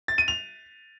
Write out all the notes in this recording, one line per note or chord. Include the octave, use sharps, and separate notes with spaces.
A6
D#7
F7